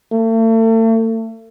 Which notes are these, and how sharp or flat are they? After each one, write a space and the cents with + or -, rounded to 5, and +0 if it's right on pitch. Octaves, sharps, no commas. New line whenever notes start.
A3 +40